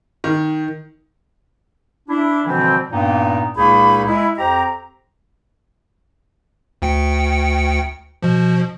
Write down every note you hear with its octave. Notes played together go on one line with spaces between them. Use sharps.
D#3
D4 E4
B2 D3 E3 F3 G3 C4
G2 A#2 A#3 B3 D#4 G5
C#2 A#2 A#3 D#4 G#4 B5
G#3 E4
F2 G4 C5 A#5
D2 G5 C#7
B2 F3